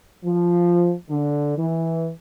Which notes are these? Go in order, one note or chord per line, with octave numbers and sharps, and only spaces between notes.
F3
D3
E3